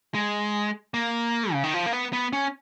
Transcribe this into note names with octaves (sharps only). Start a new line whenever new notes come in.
G#3
A#3
C#3
D#3
F3
A#3
B3
B3
C#4